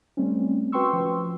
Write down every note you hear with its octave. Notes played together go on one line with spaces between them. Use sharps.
G3 A3 C4 C#4
F#4 B4 G5 C6 C#6 E6
F3